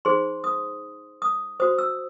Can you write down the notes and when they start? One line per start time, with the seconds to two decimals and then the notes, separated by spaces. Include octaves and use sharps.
0.05 D#4 G#4 C5 C6
0.44 D#6
1.22 D#6
1.60 F#4 C5 D#6
1.78 E6